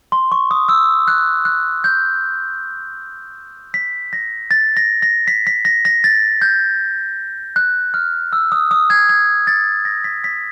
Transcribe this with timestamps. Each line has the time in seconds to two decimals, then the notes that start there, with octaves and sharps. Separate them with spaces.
0.12 C6
0.32 C#6
0.51 D#6
0.69 E6
1.08 F#6
1.45 F#6
1.84 G6
3.74 B6
4.13 A#6
4.51 A6
4.77 A#6
5.02 A#6
5.28 B6
5.47 B6
5.65 A#6
5.85 A#6
6.04 A6
6.42 G6
7.56 F#6
7.94 F6
8.33 E6
8.52 D#6
8.71 D#6
8.90 G#6
9.09 G#6
9.47 A6
9.85 A#6
10.04 B6
10.24 B6